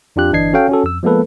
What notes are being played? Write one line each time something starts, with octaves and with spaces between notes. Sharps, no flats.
F2 D4 F4 G4 F#6
G1 E3 D4 D#5 G#6 C7
C#4 F#4 A4 C#5 F5 G5
C#4 F#4 A4
F2 E6
F3 G#3 A#3 B3 A4 B4